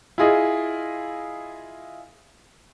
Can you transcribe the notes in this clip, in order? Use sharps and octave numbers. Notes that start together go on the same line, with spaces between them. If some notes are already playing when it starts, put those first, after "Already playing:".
E4 F4 G#4 D#5